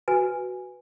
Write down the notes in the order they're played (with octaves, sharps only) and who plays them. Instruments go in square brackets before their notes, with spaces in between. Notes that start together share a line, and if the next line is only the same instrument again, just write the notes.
[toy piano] F#4 B4 G#5